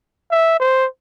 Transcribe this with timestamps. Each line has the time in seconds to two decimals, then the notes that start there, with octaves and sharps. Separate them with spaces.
0.31 E5
0.60 C5